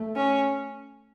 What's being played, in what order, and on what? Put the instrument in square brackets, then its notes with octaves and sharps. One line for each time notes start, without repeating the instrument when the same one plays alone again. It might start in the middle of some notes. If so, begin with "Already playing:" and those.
Already playing: [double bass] A3
[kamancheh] C#4